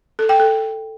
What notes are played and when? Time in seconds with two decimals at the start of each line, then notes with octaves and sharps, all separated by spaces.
0.19 A4
0.29 G5
0.40 A4